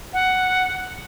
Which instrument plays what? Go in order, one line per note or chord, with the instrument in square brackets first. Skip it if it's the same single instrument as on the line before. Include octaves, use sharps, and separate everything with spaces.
[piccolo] F#5